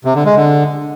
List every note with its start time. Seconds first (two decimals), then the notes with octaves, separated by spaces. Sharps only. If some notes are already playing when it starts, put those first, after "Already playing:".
0.05 C3
0.15 D3
0.25 G#3
0.36 D3